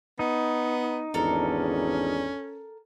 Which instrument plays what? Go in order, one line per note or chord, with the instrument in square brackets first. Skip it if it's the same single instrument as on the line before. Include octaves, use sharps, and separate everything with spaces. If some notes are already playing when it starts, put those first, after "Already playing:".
[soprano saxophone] B3 [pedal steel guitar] D#4
[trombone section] G#1 E2 D4 [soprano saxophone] C#4 [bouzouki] A4 A#4